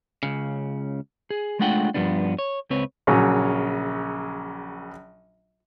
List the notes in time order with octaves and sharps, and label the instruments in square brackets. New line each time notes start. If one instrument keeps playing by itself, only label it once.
[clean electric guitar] C#2 C#3
G#4
G#3 A3 D4 F4 F#5 G5
G2 A#2 F3 G3 B3 D4
C#5
C#2 C4 B4 C#5
[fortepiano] A#1 C#3 F#3 C#4